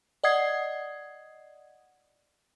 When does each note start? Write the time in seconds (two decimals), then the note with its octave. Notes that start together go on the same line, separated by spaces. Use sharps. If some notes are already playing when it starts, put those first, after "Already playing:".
0.24 D5 D#5 F#5 D#6 G#6 C7